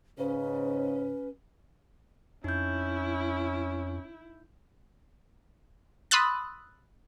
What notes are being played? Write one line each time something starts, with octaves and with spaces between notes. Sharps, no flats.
G#2 C#3 C#4 B4
F2 C#4 D#4 E4 G6
B5 C6 D#6 E6 F#6 A6